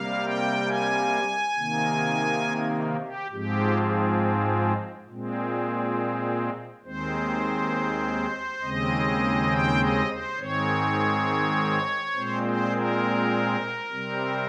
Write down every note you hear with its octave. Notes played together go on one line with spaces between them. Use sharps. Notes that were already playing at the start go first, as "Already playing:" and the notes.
Already playing: C3 G3 A#3 F5
G5
G#5
C3 D#3 A#3
G4
G#2 F3 G#3 C4 G4
A#2 G#3 C4
D#2 D#3 G#3 C4 C5
D#2 C#3 G#3 C4 D#5
G5
D#5
C5
G#2 D#3 G#3 C4 C#5
A#2 G#3 C4 C5
C5
A#4
C3 G3 C4